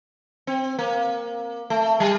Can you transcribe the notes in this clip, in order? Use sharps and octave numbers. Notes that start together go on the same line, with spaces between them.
C4
A#3
A3
G3